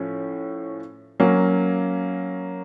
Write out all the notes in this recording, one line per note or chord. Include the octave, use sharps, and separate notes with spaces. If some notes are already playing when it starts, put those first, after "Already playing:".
Already playing: A2 F3 C#4
F#3 A#3 C#4